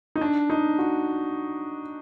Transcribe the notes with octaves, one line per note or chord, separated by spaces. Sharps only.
D#4
D4
D#4
F#4